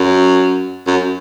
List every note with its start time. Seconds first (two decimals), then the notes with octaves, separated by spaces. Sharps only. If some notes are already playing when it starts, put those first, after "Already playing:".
Already playing: F#2
0.87 F#2